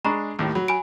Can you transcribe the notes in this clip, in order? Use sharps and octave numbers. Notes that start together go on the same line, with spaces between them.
G#3 D4 A#5 B5 C#6
D#2 A2
F#3 B5
G#5 B5 D7